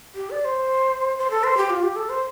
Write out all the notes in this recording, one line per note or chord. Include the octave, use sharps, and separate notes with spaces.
G4
D5
D5
C5
C5
A4
C5
G4
F4
G4
A4
C5